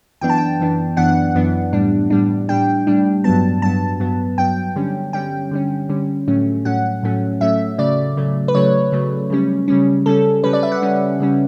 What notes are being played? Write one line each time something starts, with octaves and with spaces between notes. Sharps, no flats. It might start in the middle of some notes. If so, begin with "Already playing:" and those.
F#2 E3 B3 D4 G5
A5
G5
F#2 E3 B3 D4
F#2 E3 B3 D4 F#5
F#2 E3 B3 D4
A2 G3 D4
A2 G3 D4
A2 G3 D4 G5
A2 G3 D4
G2 F#3 B3 A5
G2 F#3 B3 A5
G2 F#3 B3
G2 F#3 B3 G5
D3 G3 C#4
D3 G3 C#4 G5
D3 G3 C#4
D3 G3 C#4
A2 F#3 A3 C#4
A2 F#3 A3 C#4 F#5
A2 F#3 A3 C#4
A2 F#3 A3 C#4 E5
C#3 F#3 A3 D5
C#3 F#3 A3
B4
C#3 F#3 A3 C#5
C#3 F#3 A3
C#3 G3 C#4
C#3 G3 C#4
C#3 G3 C#4 A4
C#3 G3 C#4 B4
D5
E5
F#5
C#3 G3 C#4
C#3 G3 C#4